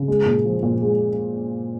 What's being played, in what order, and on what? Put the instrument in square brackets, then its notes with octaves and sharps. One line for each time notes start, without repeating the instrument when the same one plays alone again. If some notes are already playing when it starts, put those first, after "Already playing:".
Already playing: [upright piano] C#3
G#3
A#2
F3
A#2
G#3